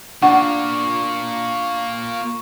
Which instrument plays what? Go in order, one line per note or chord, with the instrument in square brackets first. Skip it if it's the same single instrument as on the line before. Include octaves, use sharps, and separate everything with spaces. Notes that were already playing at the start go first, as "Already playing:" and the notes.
[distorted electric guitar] A#3 F4 [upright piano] D4 [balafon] F#5 [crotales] C#6